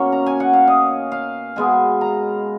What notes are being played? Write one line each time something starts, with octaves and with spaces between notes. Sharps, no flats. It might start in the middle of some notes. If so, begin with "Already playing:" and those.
Already playing: B2 A#3 C#4 C#5
A#5
G#5
F#5
F5
D#5
F5
B2 G#3 B3 G#5
A#5